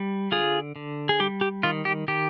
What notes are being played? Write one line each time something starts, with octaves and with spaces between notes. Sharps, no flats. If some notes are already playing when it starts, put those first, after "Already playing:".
Already playing: G3
D3 F4 G#4
D3
G#4
G3 G4
G4
D#3 F4
G4
D#3 G4